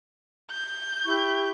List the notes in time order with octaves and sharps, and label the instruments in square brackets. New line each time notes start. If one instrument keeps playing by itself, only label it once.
[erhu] G6
[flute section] E4 G4 C#6